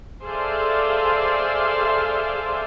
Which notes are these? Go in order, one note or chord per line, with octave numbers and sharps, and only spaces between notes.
G#4 A4 C5 D5 E5 F5